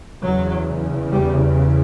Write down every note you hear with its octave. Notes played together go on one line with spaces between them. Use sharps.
E2 C#3 F#3
G3